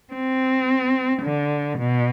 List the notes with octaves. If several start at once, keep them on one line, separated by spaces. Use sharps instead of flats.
C4
D3
B2